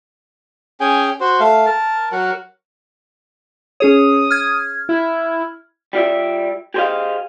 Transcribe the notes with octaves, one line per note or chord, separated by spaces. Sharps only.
C#4 G#4 G5 G#5
F#4 C5
A3 F5
A#4 A5
F#3 F#4 A#4 F#5
C#4 G#4 C#5 D#6
F6 G#6
E4
G3 F4 D5 E5
G4 G#4 C5 C#5 D#5 F5